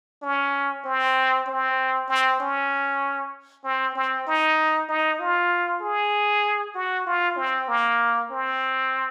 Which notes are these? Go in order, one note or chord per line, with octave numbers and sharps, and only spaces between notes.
C#4
C4
C4
C4
C#4
C4
C4
D#4
D#4
F4
G#4
F#4
F4
C4
A#3
C4